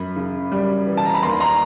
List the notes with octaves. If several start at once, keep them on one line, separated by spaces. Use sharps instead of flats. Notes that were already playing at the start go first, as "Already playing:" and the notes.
Already playing: F#2 B5
C#3
G3
E3
A5
A#5
B5
D#2 A#5 C6
A#5 C6